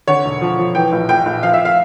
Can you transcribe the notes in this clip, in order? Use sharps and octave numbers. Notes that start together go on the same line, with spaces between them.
D3 C#5
E1
F3
F3
E3 G5
A#1
A#1 G5
A#1
F3 F5
E5
F5